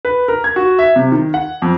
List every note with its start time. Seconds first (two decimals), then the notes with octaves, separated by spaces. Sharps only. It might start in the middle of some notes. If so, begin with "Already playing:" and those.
0.05 B4
0.28 A#4
0.44 G#6
0.56 F#4
0.79 E5
0.96 C3
1.12 D#3
1.34 F#5
1.62 F2